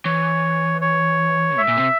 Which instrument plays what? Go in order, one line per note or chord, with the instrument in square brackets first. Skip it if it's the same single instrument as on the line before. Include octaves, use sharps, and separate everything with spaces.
[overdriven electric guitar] E3 [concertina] C#5
[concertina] C#5
[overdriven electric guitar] G#2 [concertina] E5
[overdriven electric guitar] A#2
C3